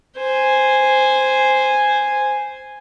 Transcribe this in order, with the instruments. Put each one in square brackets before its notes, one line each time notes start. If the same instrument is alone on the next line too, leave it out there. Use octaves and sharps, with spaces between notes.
[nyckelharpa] C5 G#5